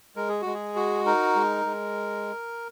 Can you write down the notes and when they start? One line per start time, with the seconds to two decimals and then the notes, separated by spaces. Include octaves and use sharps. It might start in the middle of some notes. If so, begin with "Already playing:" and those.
0.16 G#3 A#4
0.29 G#4
0.41 G#3 F#4
0.54 G#4
0.76 F#4
1.06 D#4 A#4
1.35 G#3
1.65 G#3